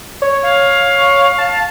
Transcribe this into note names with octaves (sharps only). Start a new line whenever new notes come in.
C#5
F5
A5